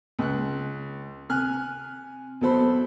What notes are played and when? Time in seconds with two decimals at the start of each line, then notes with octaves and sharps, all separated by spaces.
0.19 C#2 F#6
1.29 C3 G#5 F6 F#6
2.41 E2 F#3 A4 C5 B5